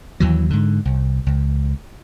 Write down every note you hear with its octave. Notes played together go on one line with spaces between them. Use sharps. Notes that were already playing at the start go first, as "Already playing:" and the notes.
D#2 E3 F#3
G#2 D3
C2
C#2